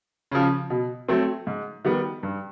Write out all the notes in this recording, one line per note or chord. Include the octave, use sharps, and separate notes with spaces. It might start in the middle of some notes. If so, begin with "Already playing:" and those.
C#3 F3
B2
F#3 A3 C4
G#2
D#3 G3 B3
G2